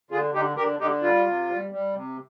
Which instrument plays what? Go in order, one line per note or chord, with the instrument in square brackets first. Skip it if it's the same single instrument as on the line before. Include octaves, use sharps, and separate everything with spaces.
[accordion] D3 F4 G#4
D3 D#4 G4
D3 G4 A#4
D3 D#4 G4
G3 F4
C3
G3
G3
C3